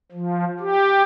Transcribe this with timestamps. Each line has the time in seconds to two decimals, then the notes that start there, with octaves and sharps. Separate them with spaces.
0.12 F3
0.60 G4